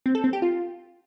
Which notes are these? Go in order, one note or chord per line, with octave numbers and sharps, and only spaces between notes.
C4
A4
C4
G4
F4